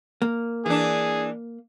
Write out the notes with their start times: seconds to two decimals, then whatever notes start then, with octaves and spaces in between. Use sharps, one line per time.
0.22 A#3
0.66 E3 D4 G#4